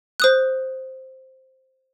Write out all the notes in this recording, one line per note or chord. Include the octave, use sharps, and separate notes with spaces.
C5 D#6 F#6